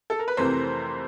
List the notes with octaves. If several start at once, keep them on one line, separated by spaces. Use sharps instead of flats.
A4
A#4
B4
F2 C3 E3 A3 A#4 C5